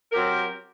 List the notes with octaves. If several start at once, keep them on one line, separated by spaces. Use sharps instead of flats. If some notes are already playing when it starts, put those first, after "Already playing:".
F#3 C4 G4 A#4